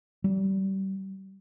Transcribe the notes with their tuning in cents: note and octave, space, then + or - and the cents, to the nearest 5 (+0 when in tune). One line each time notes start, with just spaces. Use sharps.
G3 -30